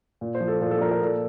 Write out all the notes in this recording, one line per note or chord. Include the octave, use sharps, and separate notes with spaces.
A#2
C5
F3
A4
A#2 A4
A4
F3 A#4
A#4
A#2 A4